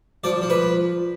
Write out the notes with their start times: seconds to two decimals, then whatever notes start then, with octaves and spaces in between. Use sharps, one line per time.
0.24 F3 D5
0.41 F3
0.50 B4